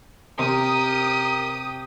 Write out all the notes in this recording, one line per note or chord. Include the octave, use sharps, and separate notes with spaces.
C3 G4 A#4 D#6